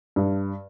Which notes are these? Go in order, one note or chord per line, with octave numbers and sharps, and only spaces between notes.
G2